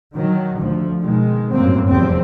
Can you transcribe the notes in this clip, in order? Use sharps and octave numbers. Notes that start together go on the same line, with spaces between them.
D#3 F#3
D2 F3
B2 D#3 G#3
G1 F#2 A2 F#3 A#3 C4
F1 E2 F3 G3 C4